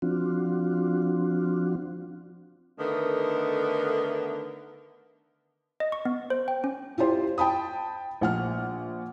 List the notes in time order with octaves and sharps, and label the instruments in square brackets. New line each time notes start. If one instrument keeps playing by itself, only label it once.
[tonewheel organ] F3 C4 D4 F4 F#4
[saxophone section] D3 D#3 A3 B3 A#4
[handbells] D#5
C#6
B3
C5
G5
C#4
[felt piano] E4 F4 G4 C5
G5 A5 B5 D#6
A#1 F#5 F6